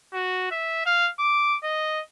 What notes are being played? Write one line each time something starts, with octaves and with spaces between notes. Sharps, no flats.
F#4
E5
F5
D6
D#5